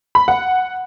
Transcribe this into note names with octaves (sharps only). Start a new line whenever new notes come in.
B5
F#5